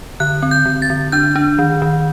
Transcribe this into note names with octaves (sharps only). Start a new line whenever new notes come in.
D3 F#6
C4
G6
D3
A6
D3
D4 G6
D4
D#3
D#3